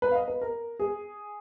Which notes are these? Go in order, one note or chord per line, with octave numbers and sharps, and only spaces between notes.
B4
F5
D#5
B4
A#4
G#4